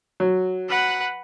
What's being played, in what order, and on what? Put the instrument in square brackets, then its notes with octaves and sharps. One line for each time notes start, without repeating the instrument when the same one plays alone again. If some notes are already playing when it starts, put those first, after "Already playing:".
[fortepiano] F#3
[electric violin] B4 F#5